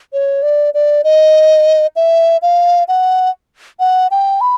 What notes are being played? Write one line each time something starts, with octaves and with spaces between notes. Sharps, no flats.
C#5
D5
D5
D#5
E5
F5
F#5
F#5
G5
B5